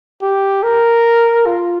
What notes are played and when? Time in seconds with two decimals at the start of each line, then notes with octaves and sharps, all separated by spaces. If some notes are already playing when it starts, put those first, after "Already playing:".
0.22 G4
0.63 A#4
1.46 F4